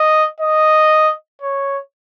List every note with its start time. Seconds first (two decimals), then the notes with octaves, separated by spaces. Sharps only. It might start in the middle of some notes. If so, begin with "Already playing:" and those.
Already playing: D#5
0.40 D#5
1.42 C#5